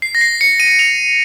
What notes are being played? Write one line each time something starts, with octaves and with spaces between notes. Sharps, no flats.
C7
A#6
C7
C#7
D#7
F7